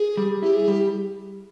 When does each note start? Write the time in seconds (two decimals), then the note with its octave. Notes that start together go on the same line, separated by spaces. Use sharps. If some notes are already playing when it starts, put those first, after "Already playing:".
Already playing: G#4
0.17 G3
0.42 E4 G4
0.55 G#4
0.68 G3 G4